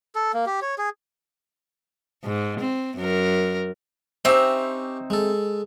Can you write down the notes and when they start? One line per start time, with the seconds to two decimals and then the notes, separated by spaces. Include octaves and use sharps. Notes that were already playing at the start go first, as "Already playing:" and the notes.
0.15 A4
0.34 A#3
0.46 G4
0.62 C#5
0.78 G#4
2.24 G#2
2.60 C4
2.97 F#2 A#4
4.25 C4 C#4 D#4 G4 C5 E5 E6
5.10 G#3 A4